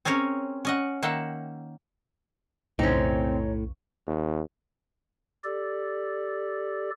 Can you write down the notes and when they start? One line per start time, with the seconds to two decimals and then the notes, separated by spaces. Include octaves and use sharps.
0.05 C4 C#4 G#4 A#4 C#5
0.65 C#4 D#5 F#5
1.02 D#3 A#3 E5 F#5 G5
2.79 B1 F2 A2 C#3 C4 C#4 D#4
4.07 D#2
5.44 G4 A4 D5